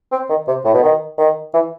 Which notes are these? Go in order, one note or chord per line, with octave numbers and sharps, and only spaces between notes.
C4
D#3
C3
A2
B2
D#3
D#3
E3